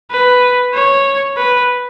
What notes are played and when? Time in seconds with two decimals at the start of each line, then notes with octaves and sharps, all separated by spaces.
0.11 B4
0.75 C#5
1.37 B4